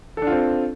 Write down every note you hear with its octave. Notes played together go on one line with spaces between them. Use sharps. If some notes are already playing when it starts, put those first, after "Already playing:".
C4 D4 F4 A4